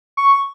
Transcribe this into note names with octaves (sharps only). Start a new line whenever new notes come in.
C#6